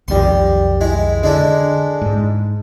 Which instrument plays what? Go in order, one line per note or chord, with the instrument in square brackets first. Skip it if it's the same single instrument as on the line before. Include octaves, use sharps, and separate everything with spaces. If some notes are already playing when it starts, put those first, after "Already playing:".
[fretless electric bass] B1 F2 D#3 [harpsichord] G3 C6
[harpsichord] G#3 E4
[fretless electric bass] D3 [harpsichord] G#3 D4 E4
[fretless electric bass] G#2